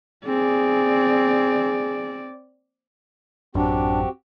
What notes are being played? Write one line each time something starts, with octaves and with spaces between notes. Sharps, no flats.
C4 G#4 D5
A1 F#2 C4 D4 F#4 G4